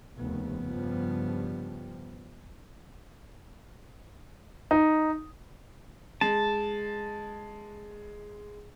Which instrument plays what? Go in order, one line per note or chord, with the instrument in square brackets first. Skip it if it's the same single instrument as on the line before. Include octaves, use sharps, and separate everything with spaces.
[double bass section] F1 D#2 [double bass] C#3 B3
[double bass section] G2 F3 G3
[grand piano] D#4
[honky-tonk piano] G#3 [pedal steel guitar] A5